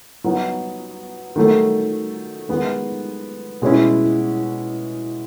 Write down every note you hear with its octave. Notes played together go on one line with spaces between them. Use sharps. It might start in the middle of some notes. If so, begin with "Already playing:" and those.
F#3 B3 D#4
D#3 F#3 A3
D#3 G#3 B3
B2 G#3 C#4 E4